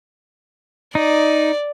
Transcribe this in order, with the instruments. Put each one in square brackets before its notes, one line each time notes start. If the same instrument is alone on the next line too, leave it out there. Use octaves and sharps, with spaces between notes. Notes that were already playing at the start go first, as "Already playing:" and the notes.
[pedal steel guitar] D#4 [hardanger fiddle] D5